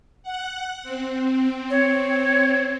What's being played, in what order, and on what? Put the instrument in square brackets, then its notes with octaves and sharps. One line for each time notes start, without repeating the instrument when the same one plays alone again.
[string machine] F#5 F#6
C4
[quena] C#5